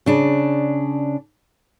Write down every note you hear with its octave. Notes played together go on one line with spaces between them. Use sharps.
C#3 D4